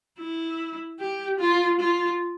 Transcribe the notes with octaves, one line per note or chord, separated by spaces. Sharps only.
E4
G4
F4
F4